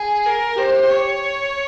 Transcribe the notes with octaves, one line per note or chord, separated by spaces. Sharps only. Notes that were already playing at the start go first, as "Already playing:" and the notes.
Already playing: G#4
A#4
G4 C5
C#5